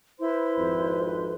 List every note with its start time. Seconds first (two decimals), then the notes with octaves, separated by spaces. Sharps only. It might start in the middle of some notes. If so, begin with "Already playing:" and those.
0.20 E4 B4 C5 C6
0.58 G#1 F2